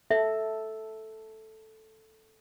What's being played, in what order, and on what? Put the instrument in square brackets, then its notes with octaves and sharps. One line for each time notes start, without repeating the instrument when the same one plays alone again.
[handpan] A4 [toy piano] E5